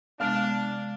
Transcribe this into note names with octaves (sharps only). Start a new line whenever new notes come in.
C3 G#3 B3 D4 F5 F6